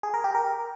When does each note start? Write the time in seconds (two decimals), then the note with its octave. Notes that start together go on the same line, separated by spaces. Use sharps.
0.03 G#4
0.14 A#4
0.24 G4
0.35 A#4